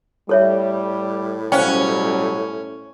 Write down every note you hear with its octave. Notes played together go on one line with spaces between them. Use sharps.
A2 G3 A4 C#5 E5
B2 F#3 G3 C#4 C5 F5 G5